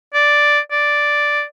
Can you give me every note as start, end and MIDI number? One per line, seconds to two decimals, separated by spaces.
0.14 0.59 74
0.72 1.43 74